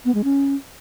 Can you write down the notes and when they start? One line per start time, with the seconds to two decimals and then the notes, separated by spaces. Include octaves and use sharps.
0.05 B3
0.15 G#3
0.24 C#4